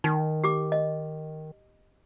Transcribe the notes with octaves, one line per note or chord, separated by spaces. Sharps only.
D#3 D#4
G4 D6
D#5